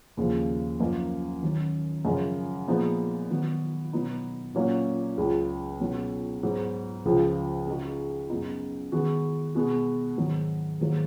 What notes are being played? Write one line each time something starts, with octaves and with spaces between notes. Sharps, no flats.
D#2 C#3 F3
F#2 F3 A#3 D#4
D#3 F#3 C#4
F#2 C#3 F3 G#3 C#4
A#2 F3 G#3 B3 D#4
D#3 F#3 B3 F#4
B2 F#3 B3 D#4
A#2 F#3 A#3 C#4 F#4
C#2 C#3 F#3
B2 F#3 C#4 F#4
G#2 F#3 B3 F#4
C#2 C#3 F3
C#3 G#3 D#4 F#4
F#2 C#3 G#3 B3 D#4
D#3 G#3 B3 F#4
B2 G#3 B3 F#4
G#2 D#3 F#3
G#2 D#3 F#3 A#3